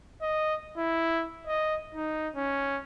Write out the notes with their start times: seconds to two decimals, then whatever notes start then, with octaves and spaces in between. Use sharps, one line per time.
0.22 D#5
0.77 E4
1.47 D#5
1.95 D#4
2.36 C#4